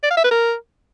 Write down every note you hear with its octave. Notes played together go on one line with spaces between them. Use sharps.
D5
F5
E5
B4
A#4